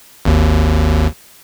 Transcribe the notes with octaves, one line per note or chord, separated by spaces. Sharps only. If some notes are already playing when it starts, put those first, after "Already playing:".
G#1 D#2